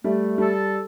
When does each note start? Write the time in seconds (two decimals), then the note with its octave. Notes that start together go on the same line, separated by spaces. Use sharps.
0.04 G3 A3
0.38 G3 A4